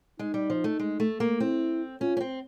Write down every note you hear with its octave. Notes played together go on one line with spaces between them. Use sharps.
G#3 D#4
G3
F3
A3
G#3
A3
A#3
C4 E4
C#4 F4
C#4
C4